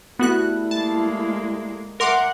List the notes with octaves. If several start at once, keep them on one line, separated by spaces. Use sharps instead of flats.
G3 A3 B3 E4 F#4 F#6
G#3 A#3 A5
A#4 E5 F#5 C6 D6